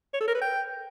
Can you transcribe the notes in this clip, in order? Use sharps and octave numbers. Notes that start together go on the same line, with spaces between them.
C#5
A4
A#4
B4
G5